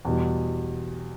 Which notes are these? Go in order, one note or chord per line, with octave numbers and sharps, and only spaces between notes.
E2 B2 G3